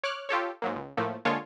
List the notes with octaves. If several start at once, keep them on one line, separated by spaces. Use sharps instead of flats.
C#5 D6 F6 F#6
F4 G4 A4 C#5
G#2 F#3 A#3
C#2
A2 F3 A3 A#3
D3 G#3 A#3 F4 C#5 A5